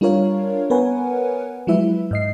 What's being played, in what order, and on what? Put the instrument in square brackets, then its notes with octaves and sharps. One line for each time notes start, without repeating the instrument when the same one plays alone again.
[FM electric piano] G3 D4 F4 A#4 C#5 F5
B3 A#4 B4 C#5 F#5 G#5
F3 F#3 G#3 E4 B4 E5
G#2 D#5 C7